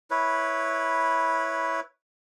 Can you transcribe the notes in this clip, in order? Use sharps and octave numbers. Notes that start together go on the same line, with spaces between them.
E4 B4 C#5